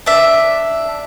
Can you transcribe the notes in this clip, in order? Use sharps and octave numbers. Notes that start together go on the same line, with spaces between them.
D4 E5